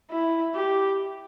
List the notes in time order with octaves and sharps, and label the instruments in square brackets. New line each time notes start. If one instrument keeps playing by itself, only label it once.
[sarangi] E4
G4